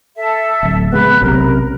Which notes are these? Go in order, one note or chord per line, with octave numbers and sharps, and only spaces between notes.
A4 E5
D1
C#3 G#3 B3 B5 F#6
B1 C3 C#4 A#4